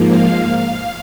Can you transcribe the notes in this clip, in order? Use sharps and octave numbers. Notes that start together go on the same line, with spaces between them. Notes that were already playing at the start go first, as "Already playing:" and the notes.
Already playing: G#2 F3 A#3
F5